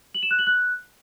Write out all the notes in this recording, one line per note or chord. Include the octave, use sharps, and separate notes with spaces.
F#7
E7
F#6
F#7
F#6